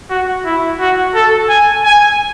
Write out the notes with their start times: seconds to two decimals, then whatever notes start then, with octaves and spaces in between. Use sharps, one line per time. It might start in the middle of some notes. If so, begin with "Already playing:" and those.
0.10 F#4
0.45 E4
0.80 F#4
1.15 A4
1.49 G#5
1.85 G#5